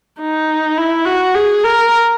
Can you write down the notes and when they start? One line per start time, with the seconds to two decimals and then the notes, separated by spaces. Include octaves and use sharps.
0.20 D#4
0.78 E4
1.06 F#4
1.34 G#4
1.64 A#4